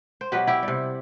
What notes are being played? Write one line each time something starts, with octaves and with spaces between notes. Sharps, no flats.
C5
B2 F#3 G4 B4
E4 G4
G3
C3